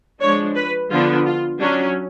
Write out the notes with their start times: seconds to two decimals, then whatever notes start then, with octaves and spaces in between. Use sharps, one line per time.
0.21 F3 G#3 D4 C#5
0.55 B4
0.90 D3 F3 B3 D4 F4
1.26 F4
1.60 F#3 C#4 D4